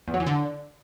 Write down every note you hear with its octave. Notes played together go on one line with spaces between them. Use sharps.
E2
F#3
E3
D3